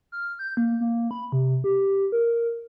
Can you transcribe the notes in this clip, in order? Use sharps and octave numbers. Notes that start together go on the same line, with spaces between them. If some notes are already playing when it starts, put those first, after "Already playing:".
F6
G6
A#3
A#3
B5
C3
G4
A#4